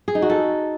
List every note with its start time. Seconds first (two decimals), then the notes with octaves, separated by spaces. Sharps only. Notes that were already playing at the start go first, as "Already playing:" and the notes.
0.08 G#4
0.15 D#4
0.22 F#4
0.30 A4